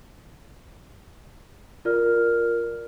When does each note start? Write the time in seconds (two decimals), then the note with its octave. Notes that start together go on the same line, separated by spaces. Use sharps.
1.85 F4 A#4 D5 F6